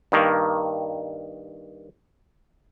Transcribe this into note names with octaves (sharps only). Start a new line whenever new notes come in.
G2 D#3 A#3